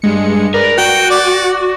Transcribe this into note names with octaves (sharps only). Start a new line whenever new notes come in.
G2 G#3 C#7
A#4 B4 D5
F#4 G5 C#7
D5